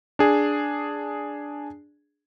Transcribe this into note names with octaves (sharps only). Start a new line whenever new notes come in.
D4 G#4